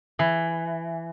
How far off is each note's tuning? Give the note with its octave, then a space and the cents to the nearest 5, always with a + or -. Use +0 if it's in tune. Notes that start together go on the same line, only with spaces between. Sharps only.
E3 +10